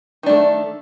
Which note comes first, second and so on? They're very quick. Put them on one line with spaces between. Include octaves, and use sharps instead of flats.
D#3 D4 A3